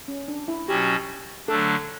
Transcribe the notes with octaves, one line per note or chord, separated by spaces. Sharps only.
C#4
D4
E4
B2 F#3 C#4 F#4 G4
D3 F#3 A3 D4 A4